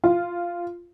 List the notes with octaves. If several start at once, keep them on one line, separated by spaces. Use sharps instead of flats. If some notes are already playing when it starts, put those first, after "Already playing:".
F4